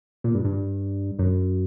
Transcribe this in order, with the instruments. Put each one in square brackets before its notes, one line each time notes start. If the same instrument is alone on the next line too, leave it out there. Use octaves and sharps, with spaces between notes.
[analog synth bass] A#2
G2
G2
F#2